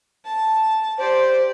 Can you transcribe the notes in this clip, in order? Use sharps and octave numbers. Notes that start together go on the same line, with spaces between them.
A5
G4 C5 D5